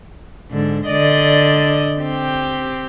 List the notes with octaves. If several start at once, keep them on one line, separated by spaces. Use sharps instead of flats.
G#2 D3
D3 D5 D#5
C4 G4